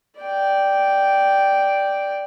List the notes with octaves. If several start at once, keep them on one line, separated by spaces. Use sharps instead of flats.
D5 G5